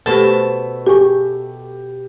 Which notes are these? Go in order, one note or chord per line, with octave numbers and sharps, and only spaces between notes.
B2 A3 G4 A4 C5 A5
G4 G#4 G#5 C#6